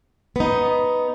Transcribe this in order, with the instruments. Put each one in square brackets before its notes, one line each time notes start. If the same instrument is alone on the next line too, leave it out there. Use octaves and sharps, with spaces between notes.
[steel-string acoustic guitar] B3 D#4